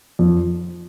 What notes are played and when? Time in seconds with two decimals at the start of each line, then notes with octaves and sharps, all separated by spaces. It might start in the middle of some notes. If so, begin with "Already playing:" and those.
0.19 F2